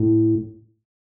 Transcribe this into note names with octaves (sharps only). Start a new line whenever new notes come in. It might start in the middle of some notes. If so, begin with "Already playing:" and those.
Already playing: A2